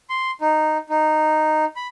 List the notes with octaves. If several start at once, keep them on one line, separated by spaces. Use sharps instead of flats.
C6
D#4
D#4
B5